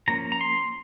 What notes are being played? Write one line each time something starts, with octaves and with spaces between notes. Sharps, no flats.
F3 A#3 C#4 A#5
A#5
C6